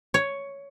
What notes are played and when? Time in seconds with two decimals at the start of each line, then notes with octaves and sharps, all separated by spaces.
0.14 C#5